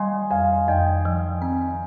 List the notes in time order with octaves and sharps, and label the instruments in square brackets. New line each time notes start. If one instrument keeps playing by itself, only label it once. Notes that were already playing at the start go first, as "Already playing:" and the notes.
Already playing: [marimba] G3 [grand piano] D#5 G#5 C6
[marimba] F2 [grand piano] F5 G#5
[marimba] F2 [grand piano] D#5 G5
[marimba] F3
C4